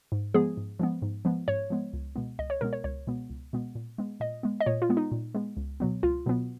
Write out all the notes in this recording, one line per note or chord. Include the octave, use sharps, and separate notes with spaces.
G#2
F3 G#3 B3 G#4
G#2
F3 G#3 B3
G#2
F3 G#3 B3
G#2 C#5
F3 G#3 B3
C#2
B2 G#3 B3
C#2 D#5
C#5
B2 G#3 B3 A#4
C#5
C#2 C#5
B2 G#3 B3
C#2
B2 G#3 B3
A#2
G#3 B3
A#2 D#5
G#3 B3
D#5
A#2 C#5
F4
G#3 B3
D#4
A#2
G#3 B3
C#2
B2 F#3 B3
C#2 F4
B2 F#3 B3